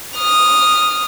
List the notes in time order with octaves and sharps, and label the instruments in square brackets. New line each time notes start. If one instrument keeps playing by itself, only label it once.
[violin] D#6 F6